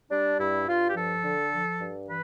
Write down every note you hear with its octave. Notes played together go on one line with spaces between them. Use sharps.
G3 D4
G2 E4
G2 F4
G4
F3 A4
D3
F3
G2
E3 B4